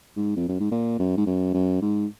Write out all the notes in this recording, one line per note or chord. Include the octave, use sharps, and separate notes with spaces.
G#2
F2
F#2
G#2
A#2
F#2
G#2
F#2
F#2
G#2